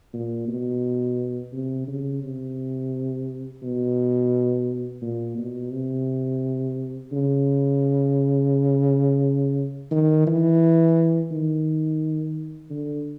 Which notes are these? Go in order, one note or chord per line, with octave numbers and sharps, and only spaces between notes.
A#2
B2
C3
C#3
C3
B2
A#2
B2
C3
C#3
D#3
E3
D#3
D3